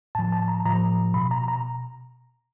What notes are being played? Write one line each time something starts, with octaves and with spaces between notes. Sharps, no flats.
A2 F3 A5
A5
A#5
A2 F3 A#5
B2 B5
A#5
A#5